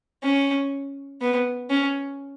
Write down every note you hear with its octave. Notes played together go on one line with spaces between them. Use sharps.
C#4
B3
C#4